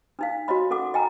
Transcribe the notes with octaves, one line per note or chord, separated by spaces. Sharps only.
D4 D#4 F5
F#4 C#5 D#5 B5
C#4 A4 F#5 D6
D#5 G5 G#5 A#5